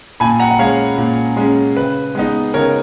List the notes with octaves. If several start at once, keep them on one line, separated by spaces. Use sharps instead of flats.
A#2 G#5 B5
F#5 A#5
F#5
G#3 C#4 C#5 F5
A#2
G#3 C#4
C#3 B4
G#3 B3 D#4
C#3 A#4 C#5